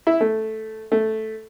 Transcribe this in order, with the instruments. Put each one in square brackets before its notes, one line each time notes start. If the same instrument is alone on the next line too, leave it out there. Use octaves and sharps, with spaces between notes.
[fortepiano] E4
A3
A3